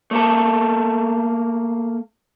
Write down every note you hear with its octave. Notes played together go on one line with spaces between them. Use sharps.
A3 A#3 A4